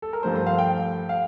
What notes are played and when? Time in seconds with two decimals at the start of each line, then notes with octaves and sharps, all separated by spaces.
0.02 A4
0.13 A#4
0.23 G2 F3 A3 C4 C5
0.35 C5
0.47 F5
0.58 G5
1.09 F5